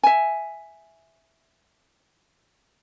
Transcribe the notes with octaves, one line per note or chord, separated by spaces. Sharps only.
E5 G#5